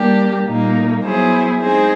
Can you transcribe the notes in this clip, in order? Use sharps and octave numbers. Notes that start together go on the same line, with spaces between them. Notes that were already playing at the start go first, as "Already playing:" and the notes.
Already playing: G3 A#3 D4 G4
A#2 G3 A#3 D#4
F#3 B3 E4 G#4 C5
G#3 C4 D#4 G#4 C5